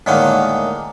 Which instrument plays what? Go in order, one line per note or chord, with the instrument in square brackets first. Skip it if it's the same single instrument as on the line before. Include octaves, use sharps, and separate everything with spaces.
[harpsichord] A2 D3 D#3 G#3 A#3 F#5